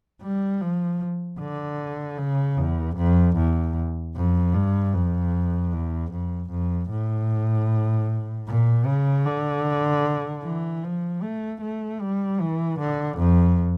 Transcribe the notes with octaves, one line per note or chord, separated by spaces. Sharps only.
G3
F3
D3
C#3
E2
F2
E2
F2
G2
F2
E2
F2
F2
A2
A#2
C#3
D3
E3
F3
A3
A3
G3
E3
D3
F2